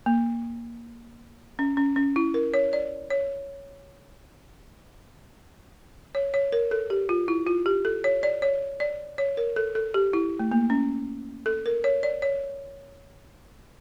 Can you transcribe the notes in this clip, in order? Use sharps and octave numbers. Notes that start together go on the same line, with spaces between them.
A#3
C#4
C#4
C#4
E4
A#4
C#5
D5
C#5
C#5
C#5
A#4
A4
G4
F4
E4
F4
G4
A4
C#5
D5
C#5
D5
C#5
A#4
A4
A4
G4
E4
A3
A#3
C#4
A4
A#4
C#5
D5
C#5